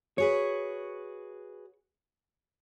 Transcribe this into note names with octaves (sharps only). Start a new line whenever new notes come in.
F#4 G#4 B4 C#5